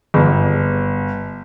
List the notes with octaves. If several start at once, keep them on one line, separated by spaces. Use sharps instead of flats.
G1